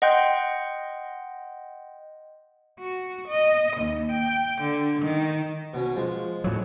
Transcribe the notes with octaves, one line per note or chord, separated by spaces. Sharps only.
D#5 F#5 G5 C6 G6
F#4
D#5
D#2
G5
D3
D#3
B2 C#4
F3 G#3
A2 F#3